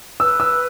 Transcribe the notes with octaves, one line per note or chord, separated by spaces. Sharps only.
B4 E6
E6